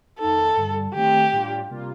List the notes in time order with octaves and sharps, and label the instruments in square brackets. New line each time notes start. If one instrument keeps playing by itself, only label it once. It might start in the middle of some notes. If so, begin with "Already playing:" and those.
[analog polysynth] F2 D#3 A#3 D#4 [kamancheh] A4
[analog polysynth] G2 D3 G3
[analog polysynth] D#3 A3 C4 D#4 [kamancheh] G4
[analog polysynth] A2 G3 D4 F4
C3 G3 A#3 F4